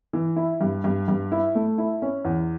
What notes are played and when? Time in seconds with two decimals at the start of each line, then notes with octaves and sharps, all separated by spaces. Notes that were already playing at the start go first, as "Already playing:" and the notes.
0.13 E3
0.36 E4
0.61 G2
0.84 G2
1.08 G2
1.32 E4
1.55 A3
1.78 E4
2.02 C#4
2.25 E2